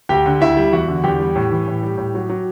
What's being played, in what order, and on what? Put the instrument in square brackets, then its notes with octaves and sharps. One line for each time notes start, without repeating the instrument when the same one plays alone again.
[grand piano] D2 G4 G5
D3
D2 E4 E5
G3
E2 F#4 F#5
D3
E2 G4 G5
G3
A2
E3
A2
G3
A2
F#3
F#3